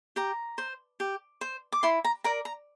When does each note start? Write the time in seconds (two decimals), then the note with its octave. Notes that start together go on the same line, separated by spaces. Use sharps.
0.16 G4 A#5
0.58 C5
1.00 G4
1.41 C5
1.72 D6
1.83 E4 C6
2.04 A#5
2.24 A#4 D5 A#5
2.45 A#5